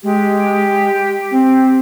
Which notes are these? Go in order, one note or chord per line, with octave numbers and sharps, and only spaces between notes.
G#3 G4
C4